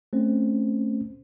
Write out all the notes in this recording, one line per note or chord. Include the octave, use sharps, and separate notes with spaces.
A3 C4 C#4 C5